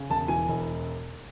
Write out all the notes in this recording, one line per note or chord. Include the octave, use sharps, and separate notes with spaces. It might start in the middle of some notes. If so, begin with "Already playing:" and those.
Already playing: C#3
E1 A5
E3 G#5
E1